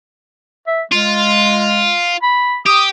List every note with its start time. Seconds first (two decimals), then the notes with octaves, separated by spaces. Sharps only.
0.67 E5
0.92 G#3 F4
2.22 B5
2.66 G4 D#6